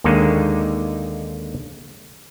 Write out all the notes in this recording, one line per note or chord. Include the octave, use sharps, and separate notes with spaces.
D#2 D3 G#3 A#3 D#4